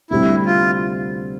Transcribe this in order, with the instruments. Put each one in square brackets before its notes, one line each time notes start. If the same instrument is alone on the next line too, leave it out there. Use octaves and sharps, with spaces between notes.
[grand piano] D2 C3 G3 C4 [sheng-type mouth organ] E4
[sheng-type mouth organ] F4